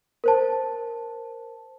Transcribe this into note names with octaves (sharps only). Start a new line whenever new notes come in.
A#4 C5 A5